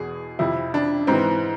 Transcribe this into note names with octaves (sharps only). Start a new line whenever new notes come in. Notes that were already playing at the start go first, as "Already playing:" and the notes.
Already playing: E2 B2 G#4
F2 C3 F3 E4
D4
G#2 E3 C4